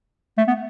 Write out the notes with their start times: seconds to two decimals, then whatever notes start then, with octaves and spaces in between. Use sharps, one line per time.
0.38 A3
0.48 B3